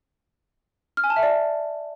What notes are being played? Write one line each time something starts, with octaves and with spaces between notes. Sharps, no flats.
F6
G#5
A5
E5
D5